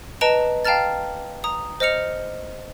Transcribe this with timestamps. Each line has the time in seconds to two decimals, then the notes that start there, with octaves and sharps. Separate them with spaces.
0.21 B4 D#5 A5 A#5 D7 E7
0.65 F5 G5 A5 A#5 F6 A6
1.44 A#5 D#6
1.80 C5 D#5 F6 C#7 F7